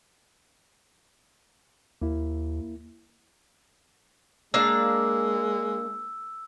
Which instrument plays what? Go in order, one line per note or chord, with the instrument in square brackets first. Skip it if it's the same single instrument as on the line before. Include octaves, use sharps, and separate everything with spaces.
[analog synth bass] D#2 [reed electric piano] A#3 E4
[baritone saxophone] G#3 [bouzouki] A#3 D4 F5 [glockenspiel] E6